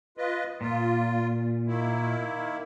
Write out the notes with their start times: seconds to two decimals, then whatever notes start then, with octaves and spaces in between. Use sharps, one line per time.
0.17 F4 B4 D#5
0.61 A#2 F4
1.67 D#3 A#3 E4